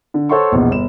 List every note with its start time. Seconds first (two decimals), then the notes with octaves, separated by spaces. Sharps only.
0.14 D3
0.29 A4 C5 C#5 F#5 C6 C#6
0.52 A#1 E2 B2
0.70 G1 E7